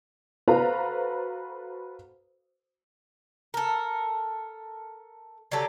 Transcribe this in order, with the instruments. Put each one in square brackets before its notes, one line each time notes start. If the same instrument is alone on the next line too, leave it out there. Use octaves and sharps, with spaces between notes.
[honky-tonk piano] F#4 A4 B4 C5 F5 A#5
[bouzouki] A4 A#4
D3 F#3 G4 A4